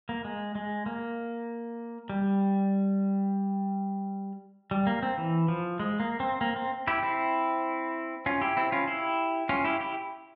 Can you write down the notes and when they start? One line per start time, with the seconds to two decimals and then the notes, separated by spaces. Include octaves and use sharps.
0.09 A#3
0.25 G#3
0.55 G#3
0.86 A#3
2.10 G3
4.71 G3
4.87 A#3
5.03 C4
5.18 E3
5.48 F3
5.79 G#3
6.00 A#3
6.20 C4
6.41 A#3
6.56 C4
6.87 E4 G4
7.03 C4 E4
8.26 C#4 F4
8.41 E4 G4
8.57 C4 E4
8.72 C#4 F4
8.87 E4 G4
9.49 C#4 F4
9.65 E4 G4
9.80 E4 G4